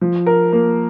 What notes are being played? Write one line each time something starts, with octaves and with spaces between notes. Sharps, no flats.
F3
A#4
A#3